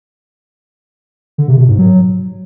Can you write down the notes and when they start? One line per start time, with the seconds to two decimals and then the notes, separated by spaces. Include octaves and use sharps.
1.38 D3
1.48 C3
1.58 B2
1.68 G#2
1.78 F#3